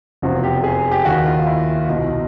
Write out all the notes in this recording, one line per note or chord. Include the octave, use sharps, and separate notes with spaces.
F1 E2 C3 F3 F#4
G4
G#4
G4
D#2 D#3 F#4
F4
E4
C2 B2 D#4